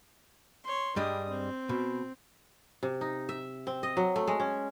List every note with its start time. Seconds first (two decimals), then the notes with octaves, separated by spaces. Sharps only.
0.64 C#5 C6
0.96 G2 G3 G#3 D4 D#6
1.29 C4
1.69 B2
2.83 C3
3.01 D#4
3.29 E5
3.67 C4
3.83 D#5
3.97 F#3
4.16 A3
4.27 G#3
4.40 C#4